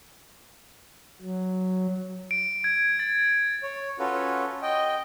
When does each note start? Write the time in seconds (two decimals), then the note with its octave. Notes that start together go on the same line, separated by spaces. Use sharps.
1.21 F#3
2.31 D7
2.64 G#6
2.99 A6
3.63 C#5
3.99 C#4 F4 F#4 A4 B4 C#5
4.62 D#5 G5